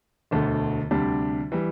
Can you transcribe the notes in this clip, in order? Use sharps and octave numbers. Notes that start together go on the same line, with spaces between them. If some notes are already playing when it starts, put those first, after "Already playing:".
E1 D2 D3 A3
D2 C3 G3 D4
E3 G3